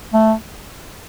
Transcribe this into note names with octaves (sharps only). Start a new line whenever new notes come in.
A3